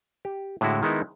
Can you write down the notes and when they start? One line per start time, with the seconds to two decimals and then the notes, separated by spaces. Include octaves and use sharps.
0.25 G4
0.61 A2 D3 G#3 E4 F#4
0.82 D#3 G#3 B3 D#4 E4